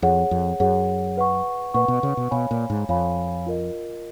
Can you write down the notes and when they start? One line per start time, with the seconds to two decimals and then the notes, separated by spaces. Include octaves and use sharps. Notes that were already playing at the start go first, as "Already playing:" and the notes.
0.02 F2 G#4 C#5 F#5
0.31 F2
0.60 F#2 G#4 C#5 F#5
1.17 B4 F#5 C#6
1.74 A#2 B4 F#5 C#6
1.88 B2
2.03 C#3
2.17 B2
2.31 B2 C#5 F5 G#5 B5
2.51 A#2
2.70 G#2
2.89 F2 C#5 F5 G#5 B5
3.46 F4 A#4 D#5